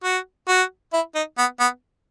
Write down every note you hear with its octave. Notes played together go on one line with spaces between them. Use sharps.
F#4
F#4
E4
D#4
B3
B3